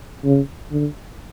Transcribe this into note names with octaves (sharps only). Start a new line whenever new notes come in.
C#3
D3